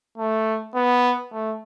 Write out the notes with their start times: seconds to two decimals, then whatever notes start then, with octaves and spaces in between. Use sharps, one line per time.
0.18 A3
0.75 B3
1.32 A3